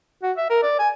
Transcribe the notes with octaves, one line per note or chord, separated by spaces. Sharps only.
F#4
E5
A#4
D5
G#5